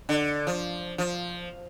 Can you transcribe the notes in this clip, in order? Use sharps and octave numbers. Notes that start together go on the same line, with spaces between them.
D3
F3
F3